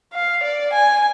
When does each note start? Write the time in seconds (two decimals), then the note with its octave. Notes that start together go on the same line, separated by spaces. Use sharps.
0.14 F5
0.44 D5
0.73 G#5